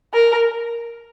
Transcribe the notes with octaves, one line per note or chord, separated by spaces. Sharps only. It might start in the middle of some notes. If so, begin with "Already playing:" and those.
A#4